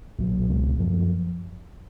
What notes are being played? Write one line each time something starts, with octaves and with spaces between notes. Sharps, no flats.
B1 A#2 F#3
C#2 B2 G#3
F#2 F3 A#3